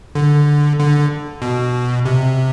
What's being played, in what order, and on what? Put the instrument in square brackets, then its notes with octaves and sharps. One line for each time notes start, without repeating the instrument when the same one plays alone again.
[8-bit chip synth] D3
D3
B2
C3